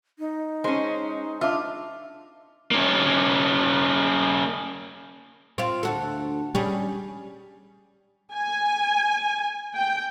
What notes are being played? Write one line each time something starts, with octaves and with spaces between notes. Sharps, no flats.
D#4
G#3 C#4 C5
D4 F4 D#5 E5
A#3 C#4
C4 F4
D2 F#4 A4
G3 C#4 G#4
G#5
G5